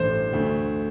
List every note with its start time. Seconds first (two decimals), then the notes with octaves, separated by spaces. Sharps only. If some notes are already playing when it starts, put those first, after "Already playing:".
Already playing: A1 G2 E3 A3 C5
0.33 D2 D3 A3